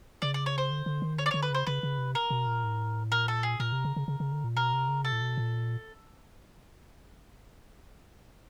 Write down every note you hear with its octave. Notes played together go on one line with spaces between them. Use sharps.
C#3 D5
D5
C#5
C5
D3
D3
D#3
D3 C#5
D5
D3 C#5
B4
C#3 C5
C#3 B4
C#3
C3
A#4
B2
A#2
A2
A#2 A#4
A4
G#4
A#2 A#4
C3
C#3
C#3
C#3
C#3
D3
A#2
B2 A#4
C3
C#3
C3 A4
A#2
B2
A#2